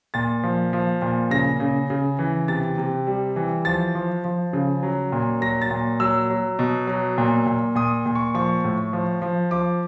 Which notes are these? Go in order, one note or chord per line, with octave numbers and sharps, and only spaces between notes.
A#2 A6
F3
F3
A#2
C#3 A#6
C#3
C#3
E3
C3 A6
C3
G3
E3
F3 A6
F3
F3
C#3
F#3
A#2
F#3 A#6
A6
A#2
F#3 E6
F#3
B2
F#3
A#2
A#2
A#2 D#6
A#2
C#6
F3 C#6
A2
F3
F3
F3 D6